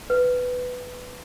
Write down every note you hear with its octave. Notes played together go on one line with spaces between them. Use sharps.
B4